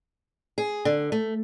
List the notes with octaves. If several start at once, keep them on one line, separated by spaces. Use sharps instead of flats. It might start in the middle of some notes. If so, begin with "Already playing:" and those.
G#4
D3
A3